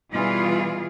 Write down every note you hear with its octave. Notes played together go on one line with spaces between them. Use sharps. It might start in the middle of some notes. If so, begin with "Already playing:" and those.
B2 E3 G3 F4 G#4